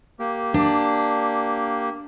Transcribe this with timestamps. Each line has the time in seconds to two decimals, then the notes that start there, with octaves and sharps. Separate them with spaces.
0.19 A#3 G4
0.54 D4